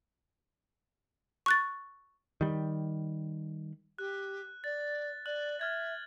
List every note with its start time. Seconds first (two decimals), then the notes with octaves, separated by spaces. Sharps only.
1.46 C#6 F#6 A6
2.41 D#3 G3
3.99 G4 F#6
4.64 D5 A6
5.26 D5 F#6 F#7
5.60 E5 F6 G#6 A6